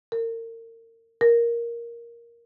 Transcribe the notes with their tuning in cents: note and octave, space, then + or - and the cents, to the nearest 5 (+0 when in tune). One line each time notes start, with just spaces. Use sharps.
A#4 -35
A#4 +5